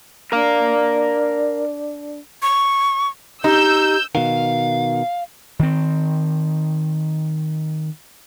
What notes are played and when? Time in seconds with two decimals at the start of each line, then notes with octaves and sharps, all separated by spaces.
0.32 D4 A#4 F5
2.42 C#6
3.44 D#4 G4 E6 G6
4.15 B2 D#3 F5
5.59 D#3 C4